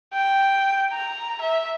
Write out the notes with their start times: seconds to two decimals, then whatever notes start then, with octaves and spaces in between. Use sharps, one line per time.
0.14 G5
0.93 A#5
1.41 E5